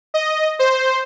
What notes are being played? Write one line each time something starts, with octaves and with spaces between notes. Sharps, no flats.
D#5
C5